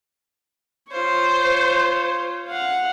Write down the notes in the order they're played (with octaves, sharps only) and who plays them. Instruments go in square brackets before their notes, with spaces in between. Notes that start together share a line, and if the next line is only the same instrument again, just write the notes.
[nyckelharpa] F4 C#5 [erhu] C5
[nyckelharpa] F5 F#5